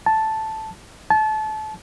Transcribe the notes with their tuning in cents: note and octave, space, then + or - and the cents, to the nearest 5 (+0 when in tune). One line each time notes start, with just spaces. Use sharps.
A5 +0
A5 -25